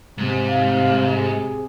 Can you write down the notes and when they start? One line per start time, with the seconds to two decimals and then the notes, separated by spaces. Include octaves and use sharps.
0.18 G#2 C3
0.48 F5
1.12 G#4